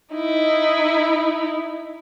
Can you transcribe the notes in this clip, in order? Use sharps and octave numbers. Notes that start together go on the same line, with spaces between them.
D#4 E4